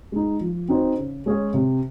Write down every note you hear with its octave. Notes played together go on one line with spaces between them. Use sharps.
G#3 D#4
F3
C4 D#4 F#4 C5
C#3
G#3 C#4 G#4 C#5
C3